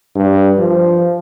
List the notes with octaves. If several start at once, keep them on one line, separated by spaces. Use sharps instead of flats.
G2
F3